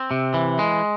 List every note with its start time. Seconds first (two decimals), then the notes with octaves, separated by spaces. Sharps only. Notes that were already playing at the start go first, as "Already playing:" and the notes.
Already playing: C4
0.11 C3
0.34 E3
0.59 G#3